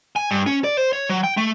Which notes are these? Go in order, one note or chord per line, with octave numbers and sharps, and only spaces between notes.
G#5
G2
C#4
D5
C5
C#5
F#3
G5
A3